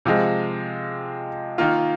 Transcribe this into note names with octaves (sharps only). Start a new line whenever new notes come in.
C3 F3 G#3
D#3 A#3 F4